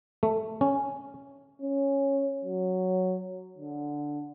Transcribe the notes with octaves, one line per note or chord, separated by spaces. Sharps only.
A3
C#4
C#4
F#3
D3